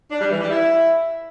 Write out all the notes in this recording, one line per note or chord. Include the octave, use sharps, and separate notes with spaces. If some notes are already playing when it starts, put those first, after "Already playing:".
D4
G3
E3
G3
E4